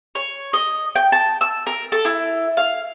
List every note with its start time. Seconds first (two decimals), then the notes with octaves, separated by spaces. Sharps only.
0.15 C#5
0.53 D#5
0.96 G5
1.12 A5
1.41 E6
1.67 A#4
1.92 A4
2.05 E4
2.57 F5